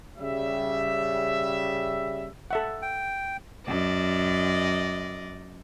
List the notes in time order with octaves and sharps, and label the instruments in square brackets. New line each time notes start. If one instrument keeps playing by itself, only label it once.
[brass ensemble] C#3 G3 E5
[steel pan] A4 E5 F#5
[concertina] G5
[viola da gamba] F#2 D5 D#5